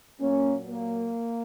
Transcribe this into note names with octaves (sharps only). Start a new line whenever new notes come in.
A#2 F#3 A#3 C#4
A#3